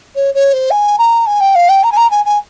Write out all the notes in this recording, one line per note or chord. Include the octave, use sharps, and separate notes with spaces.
C#5
C#5
C5
G#5
A#5
G#5
G5
F5
G5
A#5
G#5
A#5
G#5
G#5